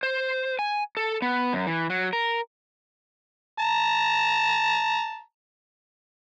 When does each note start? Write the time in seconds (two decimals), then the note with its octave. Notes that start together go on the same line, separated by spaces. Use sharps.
0.03 C5
0.59 G#5
0.97 A4
1.22 B3
1.53 F#2
1.67 E3
1.90 F#3
2.13 A#4
3.59 A5 A#5